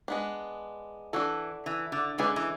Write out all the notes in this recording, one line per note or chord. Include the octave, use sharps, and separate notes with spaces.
G#3 B3 D4
E3 D4 F#4 A4
E3
D3
D3 G#3 C#4 G#4 B4
E3